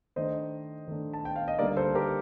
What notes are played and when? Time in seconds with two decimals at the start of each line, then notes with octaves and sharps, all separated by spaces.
0.16 D#3 A3 D4 C5 D#5
0.88 D#3 A3 D4
1.13 A5
1.25 G5
1.36 F5
1.48 D#5
1.59 D3 G3 A#3 D#4 A#4 D5
1.77 A4 C5
1.95 G4 A#4